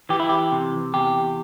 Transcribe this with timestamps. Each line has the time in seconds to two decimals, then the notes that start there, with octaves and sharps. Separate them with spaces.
0.09 E3 G4
0.20 E4
0.29 G4
0.52 C3
0.94 E2 G4